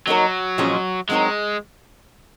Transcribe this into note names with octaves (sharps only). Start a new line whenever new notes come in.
F#3 A#3 D#4 F#4 A#4 C#5
A#2 F3 G#3 C#4 G#4
F#3 G#3 C4 D#4 A#4 C#5